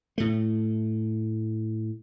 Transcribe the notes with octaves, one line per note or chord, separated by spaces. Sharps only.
A2 A3